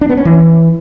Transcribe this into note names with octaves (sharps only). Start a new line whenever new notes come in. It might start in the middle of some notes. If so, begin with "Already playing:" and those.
D4
B3
C#4
E3